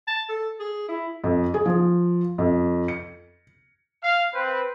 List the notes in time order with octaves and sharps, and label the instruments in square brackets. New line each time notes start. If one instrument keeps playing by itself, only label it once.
[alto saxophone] A5
A4
G#4
E4
[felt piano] F2
G#4
F3
F2
C#7
[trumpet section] F5
C4 B4